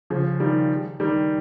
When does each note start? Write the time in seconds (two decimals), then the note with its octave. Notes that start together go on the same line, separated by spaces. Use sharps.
0.10 C#3 F3
0.40 D#3 G3
1.00 D#3 G3